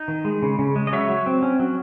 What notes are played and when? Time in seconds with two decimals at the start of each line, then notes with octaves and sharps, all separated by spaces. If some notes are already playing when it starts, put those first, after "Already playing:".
Already playing: D#4
0.08 D#3
0.25 G#3
0.42 C#3
0.59 C#3
0.76 G#3
0.87 D#5
0.92 F#3 C#5 E5
1.09 F#3
1.26 C4
1.43 C#4
1.59 F#3